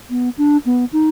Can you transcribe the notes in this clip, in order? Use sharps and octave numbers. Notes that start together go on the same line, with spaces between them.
B3
D4
B3
D#4